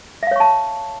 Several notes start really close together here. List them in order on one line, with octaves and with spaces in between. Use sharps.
E5 F5 C#5 C#6 A5